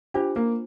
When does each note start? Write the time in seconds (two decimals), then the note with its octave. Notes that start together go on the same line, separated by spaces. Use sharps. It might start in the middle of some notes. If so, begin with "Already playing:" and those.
0.14 D4 F4 G4 C5
0.36 A#3